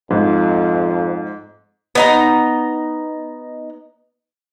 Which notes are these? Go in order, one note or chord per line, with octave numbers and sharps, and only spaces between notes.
F2 G#2
B3 D#4 A#5